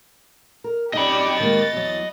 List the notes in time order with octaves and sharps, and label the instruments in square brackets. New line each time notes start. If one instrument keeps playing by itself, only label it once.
[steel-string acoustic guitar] A#4
[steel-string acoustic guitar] F#2 D#4 G5 [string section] G4 D5 [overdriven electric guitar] D#5 B5
[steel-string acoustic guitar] D#3 G#3 A#3 [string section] A6
[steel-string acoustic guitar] E2 F#3